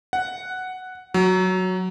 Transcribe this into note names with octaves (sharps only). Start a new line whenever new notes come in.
F#5
F#3